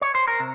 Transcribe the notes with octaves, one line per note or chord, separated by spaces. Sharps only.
C#5
C5
A#4
C3